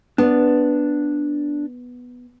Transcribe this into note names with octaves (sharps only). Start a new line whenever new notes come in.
B3 D4 D5